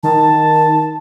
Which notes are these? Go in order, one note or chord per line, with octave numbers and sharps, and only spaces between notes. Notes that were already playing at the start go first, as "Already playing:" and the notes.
D#3 A5